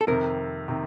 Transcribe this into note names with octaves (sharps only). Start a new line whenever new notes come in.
A4
F2 C3 D#3 A#4
C3 D#3